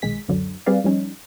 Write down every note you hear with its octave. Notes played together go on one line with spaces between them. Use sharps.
B1 D#3 G#3 G#4 B6
C#2 F#2 D3 F#3
G3 C4 G#4 B4 D5 F5
F3 G3 C#4 D#4